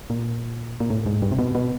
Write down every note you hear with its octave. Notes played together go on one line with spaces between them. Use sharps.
A#2
A#2
A2
G#2
G2
C3
B2
B2